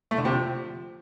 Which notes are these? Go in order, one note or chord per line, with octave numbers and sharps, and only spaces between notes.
A3
D3
C3
F3